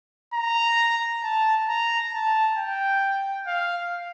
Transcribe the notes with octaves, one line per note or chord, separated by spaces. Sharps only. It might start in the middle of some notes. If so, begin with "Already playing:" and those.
A#5
A5
A#5
A5
G5
F5